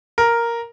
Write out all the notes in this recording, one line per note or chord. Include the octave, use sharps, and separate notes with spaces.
A#4